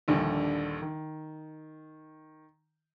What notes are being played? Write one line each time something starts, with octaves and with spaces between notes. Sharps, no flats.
A#1 D#2 D3 G3
D#3